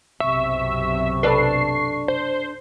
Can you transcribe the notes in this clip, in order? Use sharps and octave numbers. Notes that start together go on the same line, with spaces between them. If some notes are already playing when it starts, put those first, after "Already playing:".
B1 F#2 C3 E5 C#6
D4 A4 B4 C7
C5